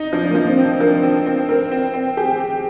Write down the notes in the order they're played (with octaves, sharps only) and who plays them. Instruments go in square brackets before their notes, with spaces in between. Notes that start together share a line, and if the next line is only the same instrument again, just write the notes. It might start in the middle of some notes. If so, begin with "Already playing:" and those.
Already playing: [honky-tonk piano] D#4
[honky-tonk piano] F3 [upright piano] D4
[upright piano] A#3
[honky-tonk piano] F3
[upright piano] C4
[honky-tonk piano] C4
[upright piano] D4
[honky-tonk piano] F3 [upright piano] A#4
[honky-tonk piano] C4
C4
[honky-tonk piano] C4 [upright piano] A#4
[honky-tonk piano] C4
C4
[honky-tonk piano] G4 [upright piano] G#4
[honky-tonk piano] G4